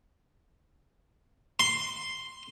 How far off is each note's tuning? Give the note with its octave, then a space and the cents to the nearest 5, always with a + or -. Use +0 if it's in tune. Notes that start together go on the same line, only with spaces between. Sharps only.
C6 +0